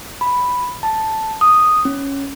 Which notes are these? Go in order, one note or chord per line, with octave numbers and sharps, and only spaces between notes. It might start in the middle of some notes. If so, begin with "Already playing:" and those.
B5
A5
D#6
C#4